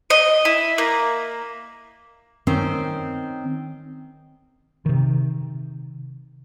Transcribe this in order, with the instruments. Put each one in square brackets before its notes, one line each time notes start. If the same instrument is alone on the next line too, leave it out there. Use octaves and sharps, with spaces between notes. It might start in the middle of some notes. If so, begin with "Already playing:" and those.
[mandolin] D#5
E4
A#3
[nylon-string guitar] D#3 C4 C#4 C5
[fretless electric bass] C3 D#3